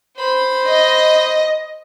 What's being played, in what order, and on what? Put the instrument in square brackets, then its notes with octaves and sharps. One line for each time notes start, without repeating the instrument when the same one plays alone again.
[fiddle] C5 B5
[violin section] D#5